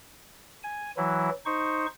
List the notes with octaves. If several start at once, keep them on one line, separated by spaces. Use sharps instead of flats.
G#5
E3 F#3 E4
D#4 C5 C#6